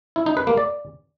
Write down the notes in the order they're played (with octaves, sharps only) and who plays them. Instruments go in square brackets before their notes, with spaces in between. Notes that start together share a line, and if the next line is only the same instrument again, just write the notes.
[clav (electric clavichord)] E4
D#4
B4
A#3
D5